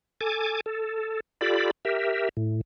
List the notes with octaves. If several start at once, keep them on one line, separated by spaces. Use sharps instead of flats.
A4 G#5 D6
A4
F4 G4 A4 D5 B5
G4 A#4 E5
A2